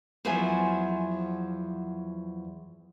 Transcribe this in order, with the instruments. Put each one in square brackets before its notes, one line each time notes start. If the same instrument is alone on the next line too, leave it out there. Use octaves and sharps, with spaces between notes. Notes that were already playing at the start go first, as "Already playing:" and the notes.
[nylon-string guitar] E2 F3 F#3 C5 E5 G#5